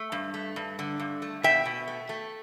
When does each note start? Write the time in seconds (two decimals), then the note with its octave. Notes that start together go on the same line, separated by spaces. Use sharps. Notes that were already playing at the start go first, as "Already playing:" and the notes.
Already playing: A3
0.12 G2
0.34 A3
0.56 G2
0.79 D3
1.00 G2
1.22 A3
1.43 B2 E5 G5
1.66 B2
1.88 A3
2.09 A3